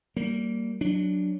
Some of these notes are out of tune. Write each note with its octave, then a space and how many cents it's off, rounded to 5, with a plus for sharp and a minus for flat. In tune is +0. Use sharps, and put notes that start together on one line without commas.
G3 -20 A#3 -15
F#3 +0 D4 +0